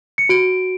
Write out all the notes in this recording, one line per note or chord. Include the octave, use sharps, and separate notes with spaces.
C#7
F#4 D7